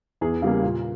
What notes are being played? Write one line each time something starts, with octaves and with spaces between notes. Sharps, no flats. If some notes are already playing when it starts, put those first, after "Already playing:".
E2 G#4
C#3 G3 A#3
A#2